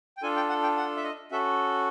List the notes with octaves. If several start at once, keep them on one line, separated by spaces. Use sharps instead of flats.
G5
D4 F4 A4 G#5
G5
F#5
G5
F#5
E5
D#5
C#4 F#4 A4 E5